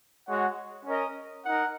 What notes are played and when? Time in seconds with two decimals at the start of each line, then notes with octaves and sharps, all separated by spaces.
0.27 G#3 F#4 C#5 F#5
0.86 C#4 A#4 D#5
1.44 D#4 A#4 F#5